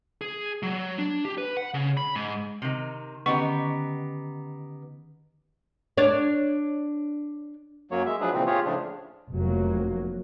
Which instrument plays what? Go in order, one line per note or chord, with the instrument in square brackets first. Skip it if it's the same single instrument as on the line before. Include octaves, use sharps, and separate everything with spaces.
[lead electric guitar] G#4
F#3
D4
G4
B4
F#5
C#3
B5
G#2
[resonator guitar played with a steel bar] C3 D#3
[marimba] D3 D#3 C#4 [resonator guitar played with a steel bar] B3 D#4 G4 [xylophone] C#6
[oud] D4 C#5 D5
[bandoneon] F#2 F#3 A#3 C#5
G#3 E5
F3 F#3 D4 G#4 B4
A#2 C#3 E3 C4
F4 G4 G#4 C#5
A2 C#3 F3 D4
[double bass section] F1 F#3 A#3